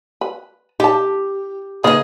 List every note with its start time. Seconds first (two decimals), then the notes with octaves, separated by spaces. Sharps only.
0.21 B4
0.80 D#4 G4 A5
1.84 C#3 A#3 D#4 G#4 B4 D#5